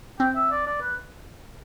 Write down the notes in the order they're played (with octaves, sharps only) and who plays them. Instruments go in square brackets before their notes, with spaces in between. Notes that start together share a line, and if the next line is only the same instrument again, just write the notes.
[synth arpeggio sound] C4 [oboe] G5
[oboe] E5
D5
D5
B4